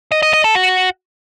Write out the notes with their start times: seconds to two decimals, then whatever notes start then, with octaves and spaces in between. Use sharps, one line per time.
0.12 D#5
0.22 D#5
0.33 D#5
0.44 A4
0.55 F#4